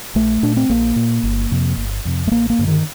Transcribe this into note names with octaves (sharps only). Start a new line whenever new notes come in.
A#1 A3
A#2 D4
C4
A#1 A#3
A#2
G1
F2 C3
G1
F2 C3
A3
A1 A#3
A#3
G2 D3
D#3